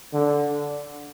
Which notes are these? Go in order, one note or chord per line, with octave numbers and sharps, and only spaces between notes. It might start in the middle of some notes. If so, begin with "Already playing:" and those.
D3